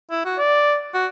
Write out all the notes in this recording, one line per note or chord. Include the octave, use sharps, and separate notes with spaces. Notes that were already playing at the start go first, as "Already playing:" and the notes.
E4
F#4
D5
F#4